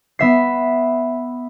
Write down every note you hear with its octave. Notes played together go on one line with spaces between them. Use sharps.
B3 E5 C7